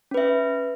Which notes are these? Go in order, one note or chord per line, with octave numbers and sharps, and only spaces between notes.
C#4 B4 E5